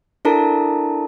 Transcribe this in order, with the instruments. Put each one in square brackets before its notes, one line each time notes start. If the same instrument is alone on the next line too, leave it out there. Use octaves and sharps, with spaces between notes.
[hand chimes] D4 E4 A4 A#4 A5 A#5